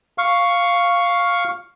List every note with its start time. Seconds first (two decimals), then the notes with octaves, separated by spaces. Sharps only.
0.18 F5 C#6